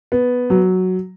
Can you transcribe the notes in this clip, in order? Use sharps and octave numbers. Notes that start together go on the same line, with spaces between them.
B3
F#3